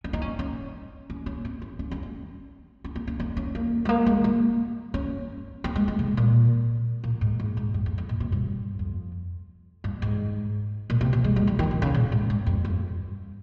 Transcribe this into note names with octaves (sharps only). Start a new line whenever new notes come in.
C#4
D#4
C#4
C#4
C#4
C#4
C4
C#4
C#4
C#4
C#4
C#4
C4
C#4
D#4
C#4
A#3
G#3
A#3
G#3
A#3
C#4
C4
G#3
G#3
C3
A#2
A#2
G#2
G#2
G#2
G2
F2
F2
A#2
C3
G2
F2
G2
G#2
A#2
C3
F3
G#3
G3
D#3
D#3
D#3
C#3
A#2
G#2
G2
F2
G2